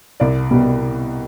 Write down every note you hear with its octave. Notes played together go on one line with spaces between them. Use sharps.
C2 D5
B2 G3